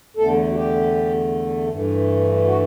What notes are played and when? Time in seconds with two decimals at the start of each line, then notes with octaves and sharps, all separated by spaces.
0.17 E2 D3 A3 A4
0.50 F#4
0.55 G4
1.70 G2 E3 A3
2.45 F#4